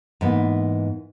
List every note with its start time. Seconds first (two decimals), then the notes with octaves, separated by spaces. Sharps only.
0.21 G#2 E3 A#3 B3